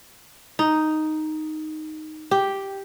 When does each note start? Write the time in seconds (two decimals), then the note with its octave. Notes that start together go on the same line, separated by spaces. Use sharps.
0.59 D#4
2.31 G4